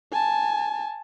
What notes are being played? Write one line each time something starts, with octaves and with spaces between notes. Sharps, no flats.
G#5 A5